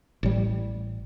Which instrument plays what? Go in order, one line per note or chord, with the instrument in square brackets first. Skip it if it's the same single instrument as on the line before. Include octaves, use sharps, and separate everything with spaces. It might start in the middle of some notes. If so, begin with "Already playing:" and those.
[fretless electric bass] A1 G3